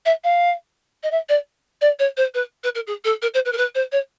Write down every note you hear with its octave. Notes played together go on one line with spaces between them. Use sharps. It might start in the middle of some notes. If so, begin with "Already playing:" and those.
E5
F5
D#5
E5
D5
D5
C#5
C5
B4
B4
A#4
G#4
A4
A#4
C5
B4
A#4
B4
C5
C#5